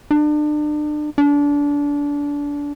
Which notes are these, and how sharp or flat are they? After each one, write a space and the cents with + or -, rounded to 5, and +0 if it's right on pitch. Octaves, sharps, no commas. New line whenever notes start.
D4 +35
D4 -25